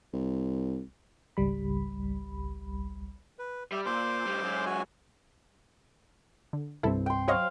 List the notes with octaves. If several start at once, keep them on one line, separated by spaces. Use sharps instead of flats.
C2
G#1 C#2 G3 B5
B4
G3 G4 E5
A#2 C5 C6 D6
A2 G3
F#2 G#3
F#4 G#5
D3
C2 G2 C4 E4 A4
G5 C6
F#3 C5 C#5 D#5 F5